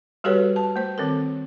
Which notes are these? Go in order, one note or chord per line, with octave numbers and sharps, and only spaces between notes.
G3 F#4 G4 A4 B4 C#5
A5
A3 C5
D#3 C4 A4 A#4